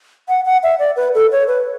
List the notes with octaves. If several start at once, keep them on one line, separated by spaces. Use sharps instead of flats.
F#5
F#5
E5
D5
B4
A4
C#5
B4